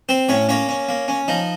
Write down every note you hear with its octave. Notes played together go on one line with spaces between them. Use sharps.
C4 C5
A2 C#4 C#5
A#3 C#4 C#5
C#4
A#3
C#4
F3 D#4